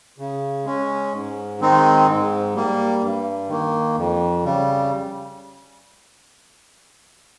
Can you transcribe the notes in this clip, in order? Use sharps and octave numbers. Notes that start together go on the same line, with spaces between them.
C#3
G#3 C#4
G#2
D#3 G#3 C4 D#4
G#2
G3 A#3
G2
D#3 A#3
F2
C#3 G3